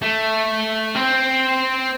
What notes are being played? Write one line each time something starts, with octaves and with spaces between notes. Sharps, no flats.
A3
C4